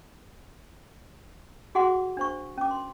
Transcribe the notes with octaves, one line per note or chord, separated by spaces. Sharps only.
F#4 G#4 F#5 C6 D6
D4 C5 C#6
C#4 D6
C6